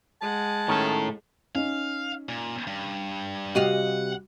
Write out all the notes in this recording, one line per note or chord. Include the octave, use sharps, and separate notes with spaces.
G#3 F#5 A5
A2 D#3 C#4 A4
C#4 D#4 F5
A#2
G2
C3 G3 F#4 D#5 F5 F#5